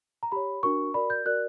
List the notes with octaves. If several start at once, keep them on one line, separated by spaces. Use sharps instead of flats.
A#5
G4 C#5 B5
D4 F#4 A#4 C#6
F#4 A#4 D5 B5
G6
F#4 A#4 D5 F#6